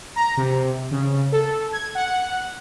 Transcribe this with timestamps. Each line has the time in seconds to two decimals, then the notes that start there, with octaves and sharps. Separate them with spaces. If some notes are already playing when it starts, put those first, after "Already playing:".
0.16 A#5
0.37 C3
0.91 C#3
1.32 A4
1.73 G#6
1.95 F#5